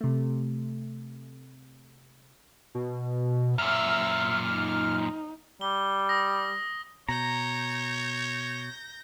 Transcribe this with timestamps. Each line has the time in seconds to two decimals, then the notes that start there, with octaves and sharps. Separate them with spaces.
0.01 C3 A3
2.75 B2
3.58 F#2 A#2 E5 E6 F6
4.52 D#4
5.61 G3 G7
6.09 D#6 A#6
7.09 B2 C#5 A#5 G6 A#6